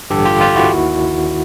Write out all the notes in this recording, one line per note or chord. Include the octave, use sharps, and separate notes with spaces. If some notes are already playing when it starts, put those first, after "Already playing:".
A1 G2 D3 G4 A4
F4 G4
F4 G4
E4 F#4
D#2 D#3